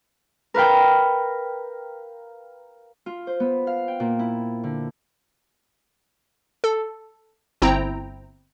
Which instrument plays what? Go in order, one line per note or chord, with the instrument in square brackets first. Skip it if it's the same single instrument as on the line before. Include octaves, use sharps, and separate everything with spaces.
[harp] A#4 B4 F5 G5
F4
C5
B3
F5
G5
A#2
E4
D3
[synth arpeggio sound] A4
G1 C4 E4 G5 A#5